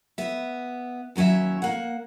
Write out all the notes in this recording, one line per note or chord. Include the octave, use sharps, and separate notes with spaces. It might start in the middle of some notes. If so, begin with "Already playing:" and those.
B3 E5
D#2 F#3 C#4 E4 E5
A#3 F#5